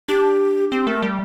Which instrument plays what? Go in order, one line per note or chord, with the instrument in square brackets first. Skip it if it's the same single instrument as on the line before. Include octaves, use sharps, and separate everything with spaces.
[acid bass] D4 [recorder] G4
[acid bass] C4 [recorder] G4
[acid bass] A3 [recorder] A#4
[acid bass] G3